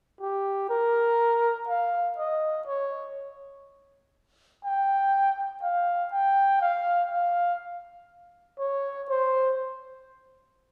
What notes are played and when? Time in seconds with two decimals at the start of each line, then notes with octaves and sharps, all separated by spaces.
0.20 G4
0.69 A#4
1.68 F5
2.17 D#5
2.67 C#5
4.65 G5
5.62 F5
6.13 G5
6.61 F5
7.10 F5
8.59 C#5
9.08 C5